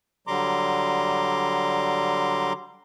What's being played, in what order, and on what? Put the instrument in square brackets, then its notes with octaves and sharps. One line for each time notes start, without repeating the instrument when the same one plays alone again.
[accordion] D3 F#3 G3 A#5 C6 D6